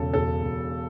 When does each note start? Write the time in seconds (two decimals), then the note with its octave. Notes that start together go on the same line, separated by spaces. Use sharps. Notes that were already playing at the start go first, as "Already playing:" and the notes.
Already playing: E1 C#3 A4
0.14 E1 A4
0.43 E1